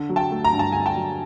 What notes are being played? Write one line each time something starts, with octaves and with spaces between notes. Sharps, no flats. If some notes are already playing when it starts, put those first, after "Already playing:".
Already playing: D3
F#3
G5 A5
A3
A#5
G2
A5
D3 G#5
G5 A5
F#3